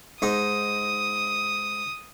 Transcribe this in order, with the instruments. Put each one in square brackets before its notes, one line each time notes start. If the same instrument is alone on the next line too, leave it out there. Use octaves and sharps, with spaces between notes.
[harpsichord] G#2 D#4 [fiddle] D#6